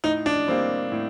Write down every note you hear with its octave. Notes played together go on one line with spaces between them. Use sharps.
A2 D#4
D4
G3 A#3 C4
A2